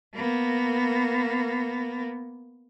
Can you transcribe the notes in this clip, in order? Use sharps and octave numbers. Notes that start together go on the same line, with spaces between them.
A#3 B3